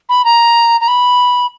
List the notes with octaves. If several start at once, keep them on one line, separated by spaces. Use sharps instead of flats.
B5
A#5
A#5
B5